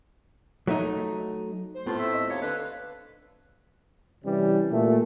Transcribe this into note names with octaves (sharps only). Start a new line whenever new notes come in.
F#3 A3 D#4
C5
A2 A3 B3 C4 F4
E5
D#5
D#2 C#5 F5
D3 B4
C3 E3 G3 C#4
A#2 A3